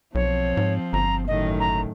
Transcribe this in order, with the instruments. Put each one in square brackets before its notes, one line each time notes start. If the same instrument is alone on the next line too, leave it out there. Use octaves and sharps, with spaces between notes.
[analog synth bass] B1 [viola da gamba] F3 C4 [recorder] C#5
[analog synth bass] G#2
[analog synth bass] G1 [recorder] A#5
[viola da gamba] F#2 A2 D#3 [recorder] D#5
[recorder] A#5